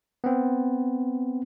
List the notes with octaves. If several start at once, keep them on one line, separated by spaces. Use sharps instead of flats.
B3 C4